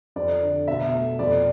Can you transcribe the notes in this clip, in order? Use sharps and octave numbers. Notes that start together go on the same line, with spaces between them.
F2 D5
D3
B2 E5
A3
F2 D5